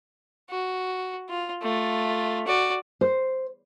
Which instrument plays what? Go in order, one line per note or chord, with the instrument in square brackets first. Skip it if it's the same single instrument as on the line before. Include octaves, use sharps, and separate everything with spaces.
[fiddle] F#4
F4
A3 F4
F#4 D5
[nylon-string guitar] C5